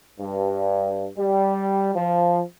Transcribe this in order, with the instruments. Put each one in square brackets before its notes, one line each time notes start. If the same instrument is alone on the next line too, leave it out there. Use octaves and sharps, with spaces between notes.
[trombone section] G2
G3
F3